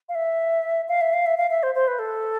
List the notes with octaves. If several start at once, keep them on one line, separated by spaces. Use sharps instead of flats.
F5
E5
F5
E5
F5
E5
F5
E5
C5
C5
B4
A4